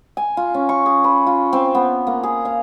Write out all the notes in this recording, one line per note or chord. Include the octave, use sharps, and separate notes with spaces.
G#5
F4
C#4
C#6
G#4
B4
F4
C4
B3
A#3
G#4
F5